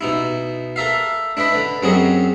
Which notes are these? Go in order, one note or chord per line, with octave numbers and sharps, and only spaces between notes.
B2 D#4 E4
A4 A#4 E5 F5
D4 E4 B4 D#5 B5
D3 B4
F#2 F#3 C4 F#4 G#4 D#5